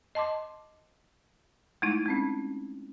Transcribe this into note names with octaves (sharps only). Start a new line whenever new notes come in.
D#5 A5 C6 D6
G#3 A3 D#4 E4
G#3 C4 C#4